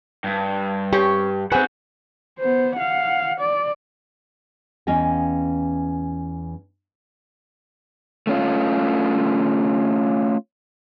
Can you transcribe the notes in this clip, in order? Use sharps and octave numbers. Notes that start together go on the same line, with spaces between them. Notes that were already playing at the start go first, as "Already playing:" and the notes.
G2
C4 C#4 G4 C#5
C4 F#4 G#4 B4 C5 F#5 G#5
B3 C5
F5 F#5
D5
E2 C#4 D#5 F5 G5
A3 C#4 F4